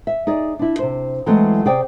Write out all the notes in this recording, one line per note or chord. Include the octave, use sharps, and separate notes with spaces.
E5
D#4 G#4 D5
D4 E4
C3 C5
E3 F#3 G#3 A3 C4
C3 G#4 C5 D5 G5